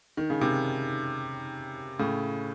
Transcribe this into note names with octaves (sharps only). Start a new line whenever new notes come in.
D#3
C#3
C3 D#3
A2 C#3